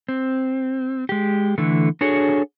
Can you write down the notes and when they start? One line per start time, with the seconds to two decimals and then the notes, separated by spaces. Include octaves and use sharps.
0.09 C4
1.09 G#3 G4
1.58 D3 E3 A3
2.01 D4 F#4 G#4 A4 C#5